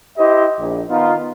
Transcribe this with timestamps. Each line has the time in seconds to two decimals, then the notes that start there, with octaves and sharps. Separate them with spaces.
0.17 E4 G4 C5 D#5
0.58 A#1
0.89 D#3 B3 D#4 F4